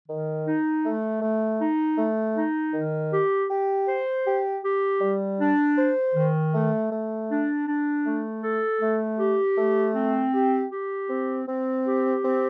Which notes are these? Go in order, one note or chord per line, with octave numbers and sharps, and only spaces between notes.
D#3
D#4
A3
A3
D#4
A3
D#4
D#3
G4
G4
C5
G4
G4
G3
D4
C5
D#3
A3
A3
D4
D4
A3
A4
A3
G4
A3
C4
G4
G4
C4
C4
G4
C4